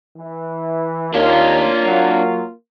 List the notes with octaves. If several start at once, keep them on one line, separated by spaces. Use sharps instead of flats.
E3
D#2 A#3 D4 F4 C#5
F#3